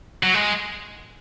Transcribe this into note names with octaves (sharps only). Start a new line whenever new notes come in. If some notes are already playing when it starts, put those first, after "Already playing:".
F#3
G#3